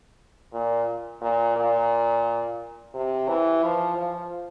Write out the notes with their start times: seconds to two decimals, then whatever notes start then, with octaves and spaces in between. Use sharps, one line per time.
0.53 A#2
1.21 A#2
1.56 A#2
2.94 C3
3.29 E3
3.63 F3
3.97 F3